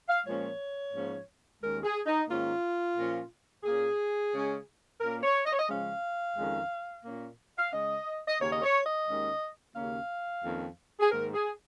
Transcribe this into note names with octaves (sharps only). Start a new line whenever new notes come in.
F5
A#2 F3 G#3 C#4 C#5
G#2 F3 A#3 C#4
D#2 D#3 G#3 C#4 A#4
G#4
D#4
G#2 D#3 A#3 C#4 F4
A#2 F3 C#4
A#2 A#3 C#4 G#4
C#3 G#3 C#4
A#2 A#3 C#4 A#4
C#5
D#5
C#5
D#5
C#3 F3 G#3 C#4 F5
F2 D#3 G#3 C#4
A#2 A#3 C#4
F5
C#3 G#3 C#4 D#5
D#5
D#2 C#3 A#3 C#4 C#5
D#5
C#5
D#5
D#2 D#3 G#3 C#4
D#2 C#3 A#3 C#4 F5
F2 D#3 A#3 C#4
G#4
G#2 D#3 A#3 A#4
G#4